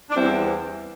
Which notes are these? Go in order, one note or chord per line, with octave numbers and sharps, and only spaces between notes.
D4
E2 E3 G3 C4 E4